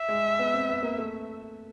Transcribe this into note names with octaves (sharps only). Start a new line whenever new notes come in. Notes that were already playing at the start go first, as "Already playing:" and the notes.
Already playing: E5
G#3
B3
C4
B3
A#3
A3